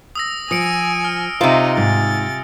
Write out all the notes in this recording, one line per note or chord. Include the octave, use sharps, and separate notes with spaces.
D#6 E6 A#6
F3 G#5 D#6 C#7 D7
F6
C3 D#4 F4 C5
G#2 G#5 A6